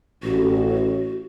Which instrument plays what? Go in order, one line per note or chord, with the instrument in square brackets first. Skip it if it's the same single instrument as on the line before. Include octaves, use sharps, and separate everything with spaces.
[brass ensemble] A1 [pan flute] F#4